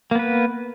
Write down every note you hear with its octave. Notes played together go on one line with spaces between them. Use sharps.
A#3 B3 B4